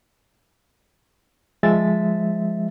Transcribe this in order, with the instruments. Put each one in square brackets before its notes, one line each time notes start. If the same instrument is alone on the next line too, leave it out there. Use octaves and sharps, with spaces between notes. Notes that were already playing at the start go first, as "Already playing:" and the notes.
[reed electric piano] F3 G#3 E5 A6